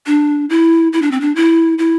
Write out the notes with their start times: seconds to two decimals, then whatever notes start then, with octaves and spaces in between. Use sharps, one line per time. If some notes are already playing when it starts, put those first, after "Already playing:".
0.07 D4
0.50 E4
0.93 E4
1.02 D4
1.11 C4
1.21 D4
1.36 E4
1.78 E4